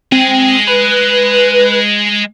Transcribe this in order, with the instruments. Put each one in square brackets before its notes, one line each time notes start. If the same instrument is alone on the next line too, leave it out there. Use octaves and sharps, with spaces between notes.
[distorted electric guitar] G#3 G#4 [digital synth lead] C4
[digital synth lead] B4